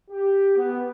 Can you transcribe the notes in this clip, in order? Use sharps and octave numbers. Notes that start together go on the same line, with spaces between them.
G4
B3